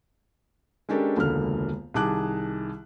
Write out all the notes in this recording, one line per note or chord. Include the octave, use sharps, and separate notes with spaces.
G#3 C#4 D4 G4 A4 A#4
E1 C#2 D3 A#3 F6
C2 D#3 G#4 A5 D6 F#6